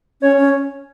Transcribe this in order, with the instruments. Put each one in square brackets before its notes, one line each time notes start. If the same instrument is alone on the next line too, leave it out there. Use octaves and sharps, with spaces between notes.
[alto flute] C#4 [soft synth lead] C#5
[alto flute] C#4